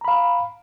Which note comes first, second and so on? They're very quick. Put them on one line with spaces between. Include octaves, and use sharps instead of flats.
A#5 B5 F5